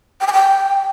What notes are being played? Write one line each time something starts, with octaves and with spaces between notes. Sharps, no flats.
G5
G#5
G5